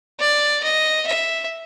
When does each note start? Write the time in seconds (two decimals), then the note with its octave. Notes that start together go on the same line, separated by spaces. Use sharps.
0.20 D5
0.63 D#5
1.07 E5